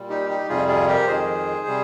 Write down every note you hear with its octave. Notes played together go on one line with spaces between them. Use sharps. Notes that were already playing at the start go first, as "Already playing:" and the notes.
Already playing: A#2 G3
D#4 G4
D#4 G4
F2 C3 G3 F4 G#4
F4 G#4
G4 A#4
F2 D#3 G#3 G#4 C5
C3 G3